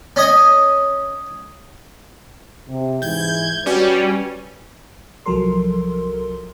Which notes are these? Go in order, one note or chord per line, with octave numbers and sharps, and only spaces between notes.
C#4 D#5 G#5
C3
G#2 E3 G6 G#6
G3 C#4 F#4 B4
C2 F3 F#3 A4 A#4 C6